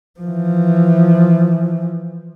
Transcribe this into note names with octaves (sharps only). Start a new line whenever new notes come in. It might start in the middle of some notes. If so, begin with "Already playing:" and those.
E3 F3